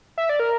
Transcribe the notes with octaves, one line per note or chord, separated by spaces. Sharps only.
E5
D5
A#4